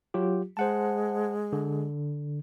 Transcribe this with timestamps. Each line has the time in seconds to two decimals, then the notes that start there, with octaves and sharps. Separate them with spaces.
0.14 F#3 F4 G4
0.57 G#3 C5 F#5 A5
1.53 D3